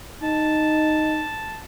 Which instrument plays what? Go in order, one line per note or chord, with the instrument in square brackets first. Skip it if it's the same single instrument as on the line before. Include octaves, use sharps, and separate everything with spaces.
[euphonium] D#4 [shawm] A5